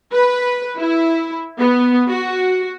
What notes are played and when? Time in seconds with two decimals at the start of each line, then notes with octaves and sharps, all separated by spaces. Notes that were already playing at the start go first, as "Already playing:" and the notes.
0.13 B4
0.79 E4
1.60 B3
2.09 F#4